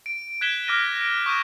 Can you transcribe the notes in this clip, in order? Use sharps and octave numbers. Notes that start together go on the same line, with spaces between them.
D7
F#6 G#6 B6 E7 G7
D6 F6 A#6 D#7
D7
C#6 D#6 G6 D#7 E7